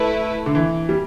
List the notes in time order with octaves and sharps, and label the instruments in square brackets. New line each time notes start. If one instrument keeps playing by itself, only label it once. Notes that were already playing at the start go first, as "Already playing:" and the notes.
Already playing: [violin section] A3 E4 B4
[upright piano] D3
E3
G3